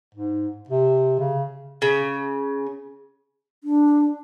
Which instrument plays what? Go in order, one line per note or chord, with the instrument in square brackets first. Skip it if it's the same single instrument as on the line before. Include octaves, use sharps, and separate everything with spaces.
[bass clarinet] G#2
C3
C#3
[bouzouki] C#3
[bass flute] D4